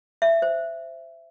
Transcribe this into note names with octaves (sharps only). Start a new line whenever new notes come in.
E5
C5